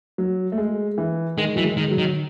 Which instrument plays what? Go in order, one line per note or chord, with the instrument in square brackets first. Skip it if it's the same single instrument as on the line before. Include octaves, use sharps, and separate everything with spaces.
[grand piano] F#3
A3
G#3
E3
[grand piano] D#3 [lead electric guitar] G#3
[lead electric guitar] E3 [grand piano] F#3
[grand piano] G#3
[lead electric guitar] D#3
[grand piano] F#3
[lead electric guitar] D#3